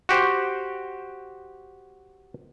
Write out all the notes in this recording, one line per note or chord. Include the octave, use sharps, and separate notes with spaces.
F#4 G4 C5